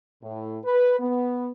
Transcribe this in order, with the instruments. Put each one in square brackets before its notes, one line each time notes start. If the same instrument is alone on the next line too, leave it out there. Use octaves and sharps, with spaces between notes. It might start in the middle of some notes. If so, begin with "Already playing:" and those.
[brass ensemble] A2
B4
B3